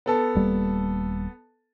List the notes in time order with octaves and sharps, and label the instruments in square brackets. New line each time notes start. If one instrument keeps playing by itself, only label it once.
[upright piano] B3 A4 A5
[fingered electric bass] D#1 G3 A#3